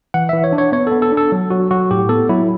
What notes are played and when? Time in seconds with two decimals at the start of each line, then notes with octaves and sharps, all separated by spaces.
0.14 E3 F#5
0.29 E3 E5
0.44 C#5
0.53 D4
0.58 C#5
0.72 B3 C#5
0.87 B3 A4
1.02 A4
1.12 D4
1.17 A4
1.32 F#3
1.50 F#3 F#4
1.71 F#3 F#4
1.91 A2 G4
2.09 B3 A4
2.29 F#3 E4